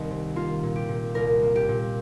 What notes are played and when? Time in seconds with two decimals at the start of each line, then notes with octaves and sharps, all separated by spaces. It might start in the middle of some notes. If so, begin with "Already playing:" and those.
Already playing: C2 D#3
0.11 C3
0.35 A#3 F4
0.63 A#2
0.76 G4
0.89 A#2
1.15 C2 A#4
1.42 A#3
1.56 G4
1.68 A#2